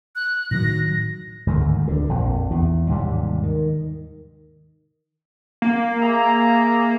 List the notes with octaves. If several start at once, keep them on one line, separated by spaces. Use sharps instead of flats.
F#6
A2 D#3 F#3 A#6
D2 G#2 D#3 A3
D2 D3
A#1 F2
E2
D#2 G#2 C3 G3
D#3
A#3
G#4 E5 A#5